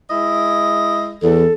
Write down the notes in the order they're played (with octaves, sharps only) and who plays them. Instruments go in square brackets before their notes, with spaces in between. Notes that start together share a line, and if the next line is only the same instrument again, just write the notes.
[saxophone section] G#3 E4 D#5
[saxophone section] E2 [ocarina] A4